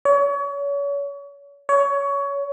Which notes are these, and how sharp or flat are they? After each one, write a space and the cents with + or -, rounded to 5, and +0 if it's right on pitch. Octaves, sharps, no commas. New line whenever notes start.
C#5 +35
C#5 +20